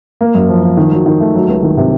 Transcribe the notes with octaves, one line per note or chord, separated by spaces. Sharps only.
A#3
F#2
F3
F3
D#3
F#3
D#3
A3
F#3
C#2
D#3
C3